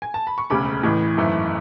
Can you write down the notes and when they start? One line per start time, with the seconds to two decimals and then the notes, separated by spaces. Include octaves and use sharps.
0.02 G#5
0.14 A5
0.27 B5
0.38 C#6
0.50 E1 D2 C#3 B5 D6
0.83 A1 A2 E3
1.17 G#1 F#2 E3 A3